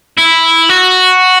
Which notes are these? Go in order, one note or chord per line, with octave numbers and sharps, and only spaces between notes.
E4
F#4